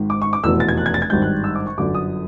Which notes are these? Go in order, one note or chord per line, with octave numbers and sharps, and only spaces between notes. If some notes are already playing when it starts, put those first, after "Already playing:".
Already playing: G#1 G#2 D#3
D6
C#6
D6
F1 E2 B2 E6
A6
G#6
F#6
G#6
A6
G#6
G#1 G2 D#3 G6
F#6
E6
D6
C#6
G1 F#2 D3 D6
D#6